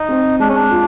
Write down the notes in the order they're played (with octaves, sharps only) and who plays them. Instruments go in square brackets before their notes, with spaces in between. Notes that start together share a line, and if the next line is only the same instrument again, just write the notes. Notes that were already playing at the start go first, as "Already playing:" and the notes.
Already playing: [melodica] D#4
[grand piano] C4
[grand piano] G#3 [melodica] D4
[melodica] C#4
D4
[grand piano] F4